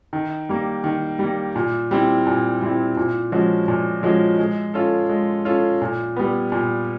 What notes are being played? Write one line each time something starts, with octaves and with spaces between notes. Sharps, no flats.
D#3
G3 A#3
D#3
G3 A#3
A#2
G3 C4 E4
A#2
G3 C4 E4
A#2
F3 G#3 C#4 F#4
A#2
F3 G#3 C#4 F#4
G#3
C#4 F4 A4
G#3
C#4 F4 A4
A#2
G3 B3
A#2